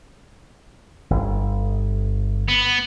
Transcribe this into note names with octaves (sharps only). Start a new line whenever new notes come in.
G1
B3